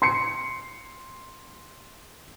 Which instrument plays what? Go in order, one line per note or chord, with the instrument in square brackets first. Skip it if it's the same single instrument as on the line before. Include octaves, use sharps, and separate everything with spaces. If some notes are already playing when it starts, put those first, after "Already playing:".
[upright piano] C6 C7 C#7